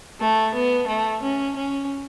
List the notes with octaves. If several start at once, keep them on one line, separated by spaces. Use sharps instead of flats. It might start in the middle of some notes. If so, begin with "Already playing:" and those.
A3
B3
A3
C#4
C#4